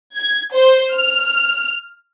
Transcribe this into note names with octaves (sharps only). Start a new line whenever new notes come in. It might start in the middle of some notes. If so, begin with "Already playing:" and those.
G#6
C5
F6